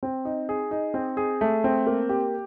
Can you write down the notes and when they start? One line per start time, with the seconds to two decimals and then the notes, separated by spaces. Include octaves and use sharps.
0.03 C4
0.25 D#4
0.49 G#4
0.71 D#4
0.94 C4
1.17 G#4
1.41 A3
1.64 C4
1.87 A#3
2.09 G4